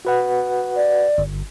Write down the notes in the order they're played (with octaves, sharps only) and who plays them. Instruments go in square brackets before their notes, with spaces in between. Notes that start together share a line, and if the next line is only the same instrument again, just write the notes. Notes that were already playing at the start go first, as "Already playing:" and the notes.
[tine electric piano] F#4 B4 F#5
[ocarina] D5
[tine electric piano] G1